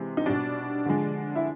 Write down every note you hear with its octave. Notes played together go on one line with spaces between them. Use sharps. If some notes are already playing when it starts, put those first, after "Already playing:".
Already playing: C3 E3 G#3
D#4
B2 G3 D4
D3 F3 G#3
E4